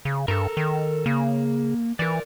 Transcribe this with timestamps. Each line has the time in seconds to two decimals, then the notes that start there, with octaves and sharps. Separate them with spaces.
0.05 C#3
0.28 G2 A4 A#4
0.57 D#3
1.06 C#3 A#3
1.99 E3 A#4 D5